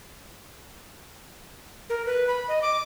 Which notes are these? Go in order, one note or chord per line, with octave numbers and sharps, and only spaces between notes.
A#4
B4
B5
D#5
D6